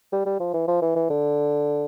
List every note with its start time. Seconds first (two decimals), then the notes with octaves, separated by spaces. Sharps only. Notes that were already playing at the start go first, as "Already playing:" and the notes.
0.12 G3
0.26 G3
0.40 F3
0.54 E3
0.68 F3
0.82 E3
0.96 E3
1.10 D3